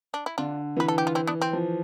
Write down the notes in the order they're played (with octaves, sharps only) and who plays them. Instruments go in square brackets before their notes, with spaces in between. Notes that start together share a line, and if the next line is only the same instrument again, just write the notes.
[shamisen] D4
E4
[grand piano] D3 [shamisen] D4 F4
[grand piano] E3 [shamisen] B4
[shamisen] A4
G4
F4
C4 E4
B3 D4
C4
[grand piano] F3